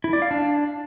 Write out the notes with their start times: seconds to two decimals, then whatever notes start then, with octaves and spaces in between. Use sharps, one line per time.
0.04 E4
0.13 D5
0.22 F5
0.31 D4